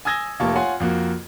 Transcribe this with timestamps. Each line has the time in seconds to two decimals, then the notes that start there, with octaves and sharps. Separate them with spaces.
0.05 G#5 D#6 E6 G#6 A#6 G7
0.40 F1 A#3 F4 G4 A5 C#6
0.55 F4 C#5 F#5 G#5 C6
0.80 F2 A#3 F#4